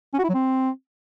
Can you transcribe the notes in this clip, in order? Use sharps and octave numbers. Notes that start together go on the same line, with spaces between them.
C#4
F#4
E4
F#3
C4